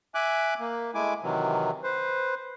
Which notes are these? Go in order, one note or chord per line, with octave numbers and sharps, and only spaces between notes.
E5 G#5 D6 F#6
A#3
G#3 A3 E4 G#5 D6
C3 D#3 E3 F#3
B4 C5